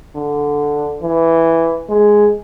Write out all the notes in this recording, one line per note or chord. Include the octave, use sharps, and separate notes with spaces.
D3
E3
G#3